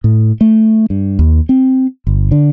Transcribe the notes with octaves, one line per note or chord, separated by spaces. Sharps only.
A2
A3
G2
D#2
C4
G1
D3